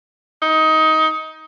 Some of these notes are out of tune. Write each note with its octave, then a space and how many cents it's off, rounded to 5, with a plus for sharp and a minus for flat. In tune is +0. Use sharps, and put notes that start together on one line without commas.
D#4 +20